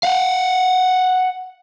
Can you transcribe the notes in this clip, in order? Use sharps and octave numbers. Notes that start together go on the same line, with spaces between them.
F5 F#5